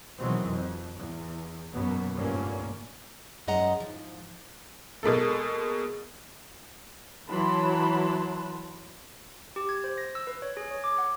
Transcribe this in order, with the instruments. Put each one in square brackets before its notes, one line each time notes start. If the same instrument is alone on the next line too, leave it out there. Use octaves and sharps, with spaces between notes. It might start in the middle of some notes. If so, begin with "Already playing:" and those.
[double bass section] B2 D#3 E3 F#3 G#3 C4
F2
E2
F#2 B2 F#3 A#3 B3
F1 G2 A#2 D3 A#3 C#4
[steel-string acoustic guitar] F#2 G#3 D#5 F#5 A#5
G#2 F3
[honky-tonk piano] B2 G#3 A#3 A4
[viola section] E3 F#3 A5 B5 C6
[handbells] G4
G#6
C5
A#6
E6
B4
C#5
G#4
C#5
D6
F#5